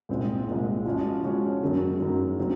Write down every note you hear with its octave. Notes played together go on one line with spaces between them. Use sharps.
C2 A#2 G#3 C4
C2 A#2 G#3 C4
F3 G#3 C#4 F#4 C#5
F3 G#3 C#4 F#4 C#5
F#2 D#3 F#3
F#2 D#3 F#3
C#3 F#3 C4